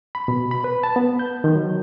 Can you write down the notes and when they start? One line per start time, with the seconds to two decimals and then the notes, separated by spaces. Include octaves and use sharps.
0.15 B5
0.28 B2
0.51 B5
0.64 B4
0.83 A5
0.96 B3
1.19 G6
1.44 D#3
1.56 F#3